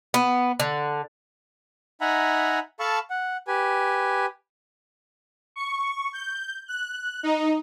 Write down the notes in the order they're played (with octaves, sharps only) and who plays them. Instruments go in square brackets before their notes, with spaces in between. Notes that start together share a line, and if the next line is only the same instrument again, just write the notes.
[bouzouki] B3
D3
[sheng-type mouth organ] D#4 E5 F#5 G#5 A#5 B5
A4 F5 A5 B5 C#6 E6
F#5
G4 B4 G#5
[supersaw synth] C#6
G6
F#6
D#4